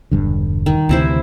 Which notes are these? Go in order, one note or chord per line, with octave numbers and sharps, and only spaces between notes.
E1 G2 D3
D#3
D2 C3 E3 E4 C5